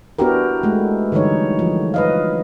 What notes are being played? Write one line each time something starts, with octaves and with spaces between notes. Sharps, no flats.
B3 D4 E4 F#4 G4 A#4
G#3 A3
D3 E3 G3 D#4 C#5
F3
B4 D#5 F5